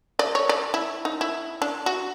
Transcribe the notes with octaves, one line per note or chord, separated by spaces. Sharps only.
D5
C#5
D5
E4
D#4
E4
D4
F#4